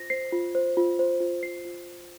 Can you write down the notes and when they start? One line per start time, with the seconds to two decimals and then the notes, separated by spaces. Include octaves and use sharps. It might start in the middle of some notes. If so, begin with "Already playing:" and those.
Already playing: F4 C5 A#6
0.10 C5 C7
0.32 F4
0.55 C5
0.77 F4
0.99 C5
1.20 F4
1.43 C5 C7
1.65 F4